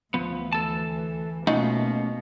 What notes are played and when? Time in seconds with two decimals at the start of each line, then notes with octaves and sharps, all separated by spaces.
0.14 D2 E3 F3 B3
0.53 A4 A5
1.47 B2 A3 A#3 C#4 D#4 F4 F#5